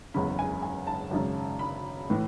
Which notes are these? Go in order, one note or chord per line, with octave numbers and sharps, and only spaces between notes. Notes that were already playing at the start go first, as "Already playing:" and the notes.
F#1 E2 C#3 B5
G#5
G#5
A5
G#1 F#2 C#3
B5
A2 E3